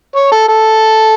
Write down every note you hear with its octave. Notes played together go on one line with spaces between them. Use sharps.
C#5
A4
A4